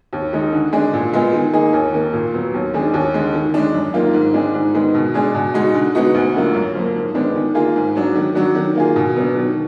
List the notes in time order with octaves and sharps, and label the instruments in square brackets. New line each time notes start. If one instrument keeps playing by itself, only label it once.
[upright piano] D#2
D#3 G#3 D#4
D3
G#3 D4 G#4
A#2
G#3 B3 F4 G#4
D#3
A#3 D#4 G#4
D#2
D#3 A#3
A#2
F#3 B3
D#2
D#3 G#3 D4 G#4
D#2
D3 G#3
D#3
G#3 D4
F#2
D#3 A#3 F4
G#2
D#3 G#3 D4 G#4
G#2
D#3 G#3 B3
B2
G#3 D4 G#4
B2
G#3 D#4 F#4
D3
G#3 B3 D#4 F#4
D2
D3 F#3 A#3 F4
F#2
F3 A#3
G#2
D#3 G#3 B3 D4
D#3
A#3 F4 G#4
G#2
F#3 D4
D#3
F#3 D4 F#4
D#3
A#3 F4 G#4
B2
F#3 B3 D4
D#3